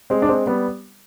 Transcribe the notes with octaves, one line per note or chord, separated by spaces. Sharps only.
G#3 C4
D4
G#3 C4
G3 B3